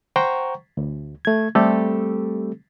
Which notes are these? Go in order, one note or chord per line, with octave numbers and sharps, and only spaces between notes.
C5 F#5 G5 A#5 C#6
D2
A3 G#6
G3 A3 C4 G4 A4